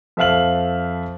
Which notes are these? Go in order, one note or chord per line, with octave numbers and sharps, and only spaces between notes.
F2 A4 E5 F5 F6 F#7